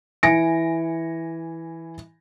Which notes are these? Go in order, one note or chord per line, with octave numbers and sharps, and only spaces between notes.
E3 G#5 A#6 C#7 D7